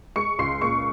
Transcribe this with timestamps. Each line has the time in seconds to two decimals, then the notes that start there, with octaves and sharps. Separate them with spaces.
0.16 G#3 C#6 C#7
0.39 C#2 C6 C7
0.61 A#2 C#6 C#7